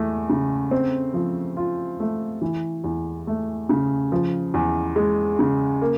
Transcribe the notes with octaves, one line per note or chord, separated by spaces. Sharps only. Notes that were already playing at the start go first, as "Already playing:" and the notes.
Already playing: E2 A3
C#3
C4
F3
F4
A3
E3
E2
A3
C#3
F3
E2
G#3
C#3
A#3